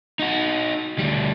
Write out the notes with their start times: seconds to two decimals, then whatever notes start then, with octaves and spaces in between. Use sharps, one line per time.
0.19 D#4 F#4
0.99 D2 G3